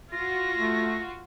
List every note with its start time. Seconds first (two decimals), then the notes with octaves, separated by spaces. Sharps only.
0.12 F4 F#4 A#6
0.57 A3